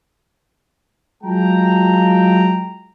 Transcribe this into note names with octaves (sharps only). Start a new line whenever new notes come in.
F#3 G#3 F4 G5 A5 A#5